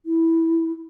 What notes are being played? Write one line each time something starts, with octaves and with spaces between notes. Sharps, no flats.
E4